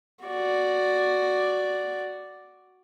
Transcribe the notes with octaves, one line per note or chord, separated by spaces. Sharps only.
F#4 D5